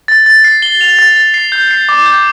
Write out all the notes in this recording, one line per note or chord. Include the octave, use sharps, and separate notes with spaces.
A6
A6
C7
G7
F7
A6
A6
C7
G6
C7
D6
G6